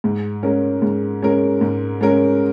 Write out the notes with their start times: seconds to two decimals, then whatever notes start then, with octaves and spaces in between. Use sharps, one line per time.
0.04 G#2
0.43 G#3 C#4 A#4
0.82 G#2
1.22 G#3 C#4 A#4
1.61 G#2
2.01 G#3 C#4 A#4